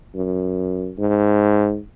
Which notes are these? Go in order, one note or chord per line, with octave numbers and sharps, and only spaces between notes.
F#2
G#2